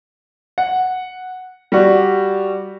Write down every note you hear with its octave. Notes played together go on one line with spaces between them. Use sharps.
F#5
G3 F#4